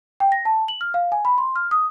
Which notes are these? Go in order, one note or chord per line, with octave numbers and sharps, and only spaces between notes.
G5
A#6
A5
F#7
F6
F5
G#5
B5
C6
F6
D#6